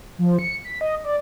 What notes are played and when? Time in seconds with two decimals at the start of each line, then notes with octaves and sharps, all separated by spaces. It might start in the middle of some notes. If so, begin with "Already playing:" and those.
0.18 F3
0.39 C#7
0.65 B6
0.81 D#5
1.04 D5